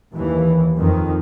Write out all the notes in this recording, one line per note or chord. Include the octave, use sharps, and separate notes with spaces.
D#2 E3
F2 D#3